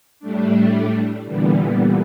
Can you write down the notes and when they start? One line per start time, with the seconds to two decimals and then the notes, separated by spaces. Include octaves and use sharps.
0.20 A2 G3 A3 D4
1.25 A#2 D3 E3 G3 B3